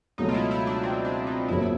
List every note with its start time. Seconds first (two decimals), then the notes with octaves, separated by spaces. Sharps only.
0.18 C#2 B2 F#3 A3 D#4
0.29 F4
0.34 E4
0.51 E4
0.67 D4
0.83 C4
1.05 D4
1.27 D#4
1.48 G1 F2 C#3 F#3 A#3 E4